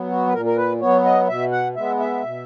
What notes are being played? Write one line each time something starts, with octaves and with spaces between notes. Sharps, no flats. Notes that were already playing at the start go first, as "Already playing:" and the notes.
Already playing: F#3 B3
F#4
B4
A#2 A#4
A#4
B4
F#3 B3 C#5
D#5
B2 E5
F#5
G#3 B3 E5
E5
B2